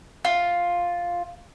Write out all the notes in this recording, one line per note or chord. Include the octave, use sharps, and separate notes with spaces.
F4